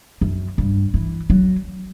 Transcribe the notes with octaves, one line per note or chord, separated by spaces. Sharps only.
F#2
G2
E3
F#3